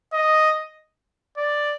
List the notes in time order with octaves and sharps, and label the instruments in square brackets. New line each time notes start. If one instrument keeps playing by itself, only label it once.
[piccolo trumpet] D#5
D5